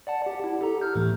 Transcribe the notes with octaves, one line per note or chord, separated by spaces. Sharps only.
D5 F#5 A5
G4 F#5
E4
G4 A4 A#5
F6 G6
A2 E3 A3